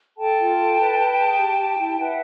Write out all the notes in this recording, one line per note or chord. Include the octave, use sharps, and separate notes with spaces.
A4 G5 A5
F4
A4
B4
B4
G#4
G4
G4
E4
B4 E5 F#5